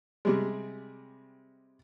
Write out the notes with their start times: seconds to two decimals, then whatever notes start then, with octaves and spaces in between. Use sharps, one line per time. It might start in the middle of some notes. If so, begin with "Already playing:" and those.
0.25 C3 G3 G#3